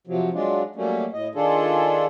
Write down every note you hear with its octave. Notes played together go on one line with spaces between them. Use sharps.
C3 F3 F#3
F#3 G#3 D4 F4
F#3 G3 A3 A#3 C#4
A2 D#5
D#3 D4 F4 G#4 A4